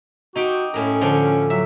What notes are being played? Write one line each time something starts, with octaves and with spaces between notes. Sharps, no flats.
D#4 F#4 G4 G5
A2 C#4 A#4
D3 F3
F#3 E5